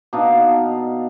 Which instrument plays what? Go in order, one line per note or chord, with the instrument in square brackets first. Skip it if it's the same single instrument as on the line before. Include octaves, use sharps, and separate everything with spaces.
[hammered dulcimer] B2 D4 D#4 F5